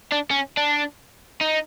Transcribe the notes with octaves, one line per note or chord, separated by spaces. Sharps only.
D4
C#4
D4
D#4